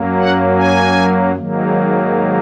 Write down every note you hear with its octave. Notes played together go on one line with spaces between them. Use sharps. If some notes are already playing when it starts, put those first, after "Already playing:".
Already playing: F#2 F#3 A#3
F#5
G#5
G#2 D#3 F#3 A#3